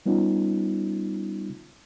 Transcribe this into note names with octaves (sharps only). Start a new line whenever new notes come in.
G3 B3 C#4 D#4 F4